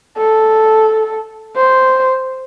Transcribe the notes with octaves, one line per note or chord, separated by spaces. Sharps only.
A4
C5